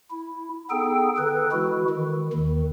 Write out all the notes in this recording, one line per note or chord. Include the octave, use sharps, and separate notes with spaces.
E4
B3 D#4 G#4 A4 G5
D3 A4 B4
E3 G#3 E4 F#4
D#3
D#2 D#3